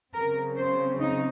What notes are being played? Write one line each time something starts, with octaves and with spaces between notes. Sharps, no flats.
C#3 F#3 C4 A#4
C5
D#4